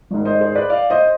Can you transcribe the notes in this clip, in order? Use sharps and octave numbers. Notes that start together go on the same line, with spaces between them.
G#1 G#2 D#3
C5 D#5
G#4 C5
B4 D5
D5 F5
C5 D#5